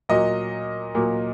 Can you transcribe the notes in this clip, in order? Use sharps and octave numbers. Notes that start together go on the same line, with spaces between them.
A#2 F#3 A#3 D#5
A#2 F#3 A#3